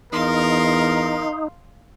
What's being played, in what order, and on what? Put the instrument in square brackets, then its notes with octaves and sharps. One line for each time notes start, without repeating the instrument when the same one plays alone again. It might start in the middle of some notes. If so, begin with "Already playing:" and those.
[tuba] E2 [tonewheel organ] D#4 [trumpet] A#4 [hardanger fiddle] F5 C6